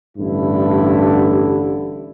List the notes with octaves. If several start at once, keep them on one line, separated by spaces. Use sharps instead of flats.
A1 G2 D3 E4